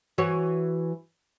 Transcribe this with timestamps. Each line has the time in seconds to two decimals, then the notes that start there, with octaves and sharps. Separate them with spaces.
0.18 E3 F#4 C#5